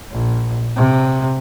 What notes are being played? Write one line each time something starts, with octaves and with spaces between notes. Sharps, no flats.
A#1
C3